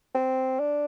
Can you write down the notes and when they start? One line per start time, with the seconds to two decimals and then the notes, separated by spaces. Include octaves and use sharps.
0.14 C4
0.59 D4